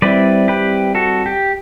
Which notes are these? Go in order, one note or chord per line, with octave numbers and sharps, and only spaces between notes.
G3 C4 E4 B4 D5
G4 B4
F#4 A4
G4